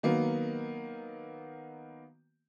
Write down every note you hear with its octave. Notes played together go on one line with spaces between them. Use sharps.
D#3 F#3 A#3 B3